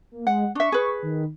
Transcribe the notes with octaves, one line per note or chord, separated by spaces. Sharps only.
A#3
G#3 F#5
D4 E5 C#6
G#4 B4
D#3